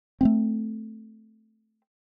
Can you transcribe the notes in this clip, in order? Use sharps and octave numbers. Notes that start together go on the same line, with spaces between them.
A3 A#3 C4